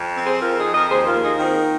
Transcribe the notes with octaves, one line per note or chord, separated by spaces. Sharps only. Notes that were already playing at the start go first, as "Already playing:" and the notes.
Already playing: F2
C4
G#4 C5
F2 F4 A#4
D#4 G#4
F2
A#4 D#5
D#2 G#4 C5
F4 A#4
A#3
D#4 G#4
D#3 C4 F4